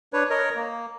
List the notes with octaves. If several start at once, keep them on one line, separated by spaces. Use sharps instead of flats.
D4 B4 C#5
A#4 C#5 D#5
A#3